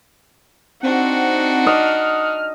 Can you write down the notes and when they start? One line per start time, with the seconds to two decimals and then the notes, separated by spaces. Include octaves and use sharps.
0.83 C4 D4 D#4 F#4 F#5
1.67 D#5 F6